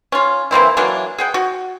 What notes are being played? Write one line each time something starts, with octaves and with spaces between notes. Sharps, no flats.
C#4 F4
E3 A#3 C4 E4
E3 F#3 A#3 D4
G#4 F#5 G5
F#4